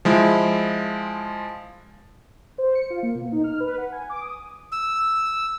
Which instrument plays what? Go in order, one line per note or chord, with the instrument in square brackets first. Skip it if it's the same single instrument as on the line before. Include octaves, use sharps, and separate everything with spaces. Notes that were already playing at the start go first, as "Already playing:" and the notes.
[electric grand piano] F3 G#3 E4
[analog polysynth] C5
C#7
F4
A#3
B2
D#4
F6
B4
F#5
G#5
D6
D#6
[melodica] E6